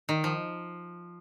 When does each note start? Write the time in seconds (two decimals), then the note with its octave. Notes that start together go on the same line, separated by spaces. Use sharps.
0.09 D#3
0.24 F3